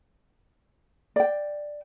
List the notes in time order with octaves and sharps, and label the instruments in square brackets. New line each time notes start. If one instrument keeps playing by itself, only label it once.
[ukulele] D5 G5